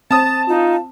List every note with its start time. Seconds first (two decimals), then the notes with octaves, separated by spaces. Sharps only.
0.11 C4 A5 D#6 A6
0.49 D#4 F4